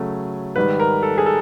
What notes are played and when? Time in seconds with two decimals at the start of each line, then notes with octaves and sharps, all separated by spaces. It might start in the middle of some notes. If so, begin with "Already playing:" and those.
Already playing: C#3 F#3 A3
0.56 G#2 D#3 G3 B4
0.80 A#4
1.03 A4
1.18 G#4
1.26 A4